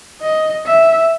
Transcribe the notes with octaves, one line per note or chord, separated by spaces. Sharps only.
D#5
E5